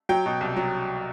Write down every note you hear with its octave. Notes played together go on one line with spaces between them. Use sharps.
F#3 G5
B2
C2
F#3